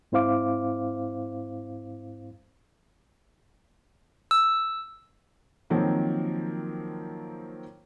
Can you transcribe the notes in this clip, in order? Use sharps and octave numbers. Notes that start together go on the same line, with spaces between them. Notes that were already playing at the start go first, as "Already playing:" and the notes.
G#2 C4 E4 C5 F5 D6
E6
D#3 F3 F#3 A#3 C4